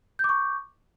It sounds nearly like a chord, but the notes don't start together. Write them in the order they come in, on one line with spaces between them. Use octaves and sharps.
G6 D6 C#6